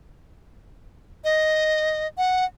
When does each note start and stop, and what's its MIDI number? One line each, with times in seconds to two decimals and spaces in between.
1.24 2.07 75
2.18 2.45 78